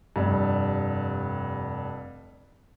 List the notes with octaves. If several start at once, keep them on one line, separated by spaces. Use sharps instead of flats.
F1 G2